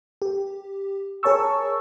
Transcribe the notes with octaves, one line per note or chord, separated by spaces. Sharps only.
G4
G#4 A#4 C#5 A5 C#6 E6